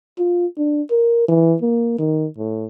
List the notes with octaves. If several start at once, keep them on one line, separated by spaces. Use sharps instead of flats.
F4
D4
A#4
E3
A#3
D#3
A2